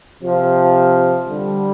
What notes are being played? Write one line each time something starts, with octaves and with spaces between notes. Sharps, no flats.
C3 F3
D3 G3